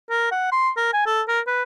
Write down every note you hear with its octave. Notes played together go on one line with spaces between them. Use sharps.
A#4
F#5
C6
A#4
G#5
A4
A#4
B4